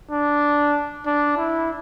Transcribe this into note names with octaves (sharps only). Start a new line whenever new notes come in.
D4
D4
E4